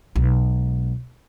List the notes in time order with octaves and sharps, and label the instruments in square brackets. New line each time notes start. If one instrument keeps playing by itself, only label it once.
[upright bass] B1 G#3